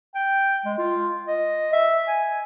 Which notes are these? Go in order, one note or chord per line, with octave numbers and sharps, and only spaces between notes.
G5
G#3
F4
D#5
E5
G#5